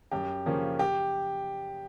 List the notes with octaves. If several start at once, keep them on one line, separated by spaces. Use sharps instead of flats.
F#2 G4
C#3 F3 A#3 C#4
G4